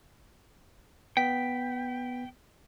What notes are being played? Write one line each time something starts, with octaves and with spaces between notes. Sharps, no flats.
B3 G5 B6